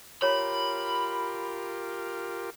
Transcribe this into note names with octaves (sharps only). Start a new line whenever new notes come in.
F4 G4 A#4 C#5 A#5 B5